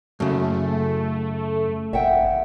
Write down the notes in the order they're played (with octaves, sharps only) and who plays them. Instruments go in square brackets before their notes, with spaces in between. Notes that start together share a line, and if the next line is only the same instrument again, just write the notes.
[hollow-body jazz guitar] F#2 C#3 [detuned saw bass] A3
[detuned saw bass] G#1 [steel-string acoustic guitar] E5 F#5 G5